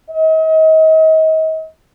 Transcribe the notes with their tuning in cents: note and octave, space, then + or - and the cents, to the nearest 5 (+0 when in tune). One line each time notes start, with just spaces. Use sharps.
D#5 +35